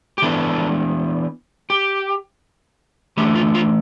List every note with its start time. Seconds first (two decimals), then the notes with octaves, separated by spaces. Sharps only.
0.18 G4
0.22 E3 B3 D4 A4
1.70 G4
3.17 E3 A3 D4 G4
3.36 F4
3.55 F4